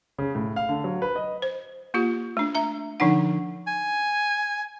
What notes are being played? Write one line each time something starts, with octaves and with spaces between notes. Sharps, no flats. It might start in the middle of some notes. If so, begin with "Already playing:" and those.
C#3
A2
F5
D3
F#3
B4
D#5
C5
A#3 F4 G4
A3 D4
E5 A#5
D3 F3 D4 D#4 F#5
G#5